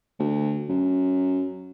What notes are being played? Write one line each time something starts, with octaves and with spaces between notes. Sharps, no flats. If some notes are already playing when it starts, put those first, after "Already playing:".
D2
F#2